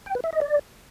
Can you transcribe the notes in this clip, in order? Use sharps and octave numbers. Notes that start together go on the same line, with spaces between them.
G5
B4
E5
D#5
D5